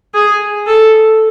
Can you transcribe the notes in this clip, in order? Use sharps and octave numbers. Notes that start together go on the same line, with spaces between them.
G#4
A4